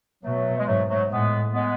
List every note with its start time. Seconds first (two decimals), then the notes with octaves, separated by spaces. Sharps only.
0.23 B2 F#3 A3
0.58 G#3
0.66 G#2 F#3 A3
0.88 F#3 A3
1.10 A2 G#3 B3
1.53 G#3 B3